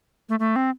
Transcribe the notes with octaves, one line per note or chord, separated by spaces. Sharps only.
A3
A3
C4